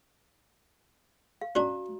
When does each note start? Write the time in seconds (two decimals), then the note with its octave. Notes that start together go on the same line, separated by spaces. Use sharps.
1.41 F5
1.55 C#4 D4 F#4 A#5